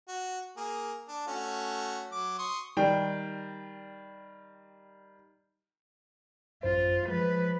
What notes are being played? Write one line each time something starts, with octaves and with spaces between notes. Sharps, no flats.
F#4
A#3 G#4
D4
A3 C#4 F#4
F#3 D6
C6 C#6 D#6
D#3 G3 G5
A1 F#2 F4 C5
F3 G#3 B4